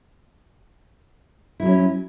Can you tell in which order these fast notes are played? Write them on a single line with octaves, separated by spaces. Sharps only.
E4 F#3 C#4